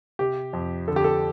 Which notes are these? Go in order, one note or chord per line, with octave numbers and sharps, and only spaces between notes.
C3 G4
F2
D3 A4
G4
A4